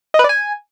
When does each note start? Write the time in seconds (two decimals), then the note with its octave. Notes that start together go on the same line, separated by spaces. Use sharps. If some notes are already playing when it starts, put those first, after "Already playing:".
0.14 D#5
0.19 B4
0.24 D5
0.29 G#5